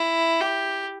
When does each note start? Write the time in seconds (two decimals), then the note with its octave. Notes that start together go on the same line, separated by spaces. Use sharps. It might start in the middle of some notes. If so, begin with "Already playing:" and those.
Already playing: E4
0.41 G4